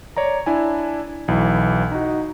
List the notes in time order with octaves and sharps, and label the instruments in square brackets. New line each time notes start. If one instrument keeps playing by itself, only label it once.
[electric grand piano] C#5 D5 A#5
D4 E4 G#5
B1 E3
D#4 F#4